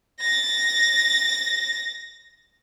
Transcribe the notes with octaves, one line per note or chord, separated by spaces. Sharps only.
A6 A#6